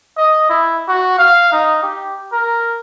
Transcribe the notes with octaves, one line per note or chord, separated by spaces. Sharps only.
D#5
E4
F#4
F5
D#4
G4
A#4